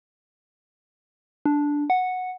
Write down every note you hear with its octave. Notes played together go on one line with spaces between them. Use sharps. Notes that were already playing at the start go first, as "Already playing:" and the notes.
D4
F#5